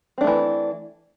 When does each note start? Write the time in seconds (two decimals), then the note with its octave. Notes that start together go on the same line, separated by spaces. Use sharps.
0.18 C4
0.21 D4
0.24 A3
0.27 E3